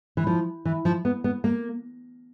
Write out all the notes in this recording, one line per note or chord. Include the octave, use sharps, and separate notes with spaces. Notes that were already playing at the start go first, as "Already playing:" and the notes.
E3
F3
E3
F3
B3
B3
A#3